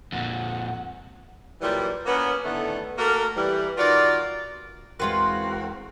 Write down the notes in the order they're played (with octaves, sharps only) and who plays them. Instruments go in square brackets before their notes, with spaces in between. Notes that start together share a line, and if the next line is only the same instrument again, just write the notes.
[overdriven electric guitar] F2 A#2 [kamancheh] F#5
[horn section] A#2 E3 F#3 G3
A#3 B3 C#4
A2 D3 D#3 A3 B3
A3 A#3 F#4 A#4
E3 G3
D#3 F4 F#4 A#4 D5
[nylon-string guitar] E2 G#3 [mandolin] A#3 F4 B4 [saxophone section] C4 F#4 A#4